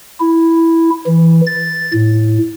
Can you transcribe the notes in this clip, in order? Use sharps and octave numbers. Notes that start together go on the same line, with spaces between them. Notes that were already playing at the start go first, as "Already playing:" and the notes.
E4
E3
A6
A2